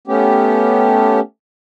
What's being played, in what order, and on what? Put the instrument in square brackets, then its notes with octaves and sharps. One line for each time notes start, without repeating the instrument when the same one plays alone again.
[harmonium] A3 B3 C#4 G4